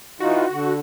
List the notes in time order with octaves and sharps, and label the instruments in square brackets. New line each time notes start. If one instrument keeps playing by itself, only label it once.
[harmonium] E3 D#4 F4 [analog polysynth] F#4
[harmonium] D3